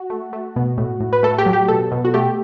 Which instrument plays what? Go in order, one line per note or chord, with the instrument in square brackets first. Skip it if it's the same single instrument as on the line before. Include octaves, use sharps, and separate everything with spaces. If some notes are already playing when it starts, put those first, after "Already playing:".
Already playing: [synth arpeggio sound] F#4
A3
A3
B2
A2
A2
B4
A3 A4
G4
F#3
G4
B2 A4
B2
F#4
A3 G4